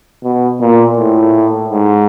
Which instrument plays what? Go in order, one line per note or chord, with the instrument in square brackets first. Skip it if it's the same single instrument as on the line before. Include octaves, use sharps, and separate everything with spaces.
[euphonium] B2
A#2
A2
G#2